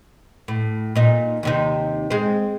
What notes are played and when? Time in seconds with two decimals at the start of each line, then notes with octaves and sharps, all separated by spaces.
0.48 A2
0.96 A#2 D#4
1.43 D#2 C3 D#4
2.10 G#3 C4